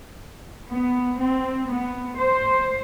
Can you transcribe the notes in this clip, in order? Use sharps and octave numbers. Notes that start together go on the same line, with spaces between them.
B3
C4
B3
C5